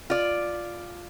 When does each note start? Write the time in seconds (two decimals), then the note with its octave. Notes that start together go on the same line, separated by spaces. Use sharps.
0.10 F4 D5